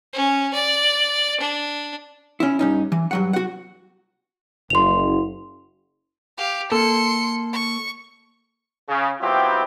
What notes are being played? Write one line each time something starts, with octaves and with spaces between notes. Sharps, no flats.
C#4
D5
D4
C#4 E4
G2 C#4 D#4
E3
G2 F#3 F#5
F#4 F#5
F#1 C6 F7
G4 F5
A#3 A4 C6 C#7
C#6
C#3
F#3 B3 C4 E4 F4 G4